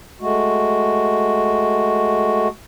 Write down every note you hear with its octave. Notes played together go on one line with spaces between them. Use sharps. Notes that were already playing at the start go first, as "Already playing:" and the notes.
G#3 A3 F#4